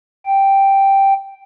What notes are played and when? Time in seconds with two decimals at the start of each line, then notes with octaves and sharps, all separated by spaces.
0.26 G5